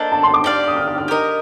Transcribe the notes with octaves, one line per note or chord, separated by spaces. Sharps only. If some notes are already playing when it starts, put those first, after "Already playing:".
Already playing: A#3 D4 A4 C5 D#5
A5
C6
D6
G4 D5 F5
D#6
F6
F6
F6
G4 A#4 D#5